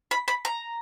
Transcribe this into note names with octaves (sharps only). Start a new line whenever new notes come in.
B5
B5
A#5